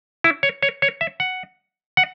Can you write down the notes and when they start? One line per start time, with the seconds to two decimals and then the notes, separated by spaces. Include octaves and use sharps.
0.24 E4
0.43 C#5
0.63 C#5
0.82 C#5
1.01 E5
1.20 F#5
1.97 F#5